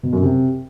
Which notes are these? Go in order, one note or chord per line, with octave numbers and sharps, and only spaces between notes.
B2
F#2
C3